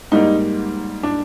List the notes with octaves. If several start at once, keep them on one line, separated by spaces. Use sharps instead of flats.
G#2 G3 A#3 D#4
D4